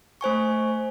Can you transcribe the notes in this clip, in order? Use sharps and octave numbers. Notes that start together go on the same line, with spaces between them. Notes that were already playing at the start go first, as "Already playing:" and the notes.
A3 C5 G#5 C#6